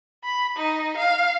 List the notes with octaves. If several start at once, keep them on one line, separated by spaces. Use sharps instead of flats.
B5
D#4
F5